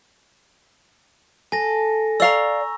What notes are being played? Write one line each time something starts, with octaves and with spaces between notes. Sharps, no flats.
A4 G#5 A#6
D5 F5 A#5 C#6 E6